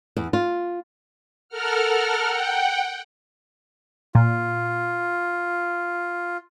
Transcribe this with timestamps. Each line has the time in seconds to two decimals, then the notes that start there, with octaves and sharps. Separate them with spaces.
0.17 E2
0.33 F4
1.49 A4 A#4 F#5 F6
2.23 F#5 G5
4.15 A#2 F4